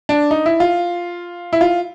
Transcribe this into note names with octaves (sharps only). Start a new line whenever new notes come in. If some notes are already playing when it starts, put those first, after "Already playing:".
D4
D#4
E4
F4
E4
F4